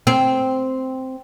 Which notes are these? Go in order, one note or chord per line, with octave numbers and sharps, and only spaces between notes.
C4